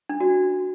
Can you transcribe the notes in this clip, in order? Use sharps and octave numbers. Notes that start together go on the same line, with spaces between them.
D4
F#4